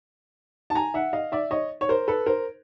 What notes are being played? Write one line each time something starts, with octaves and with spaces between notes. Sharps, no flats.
A5
G#5 A#5
E5 F#5
D#5 F5
D5 E5
C#5 D#5
C#5
A#4 C5
A4 B4
A#4 C5